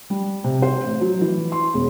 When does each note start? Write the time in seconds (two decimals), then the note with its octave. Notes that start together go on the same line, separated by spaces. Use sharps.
0.10 G3
0.44 C3
0.62 C5
0.83 A1
1.01 F#3
1.21 E3
1.52 C6
1.74 E1